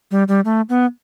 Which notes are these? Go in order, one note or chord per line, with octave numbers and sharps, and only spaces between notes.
G3
G3
A3
B3